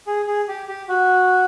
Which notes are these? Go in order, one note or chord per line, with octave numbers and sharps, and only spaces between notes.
G#4
G#4
G4
G4
F#4